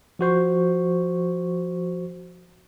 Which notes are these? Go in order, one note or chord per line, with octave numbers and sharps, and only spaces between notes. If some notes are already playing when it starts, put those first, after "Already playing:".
F3 F#4 C5 C#6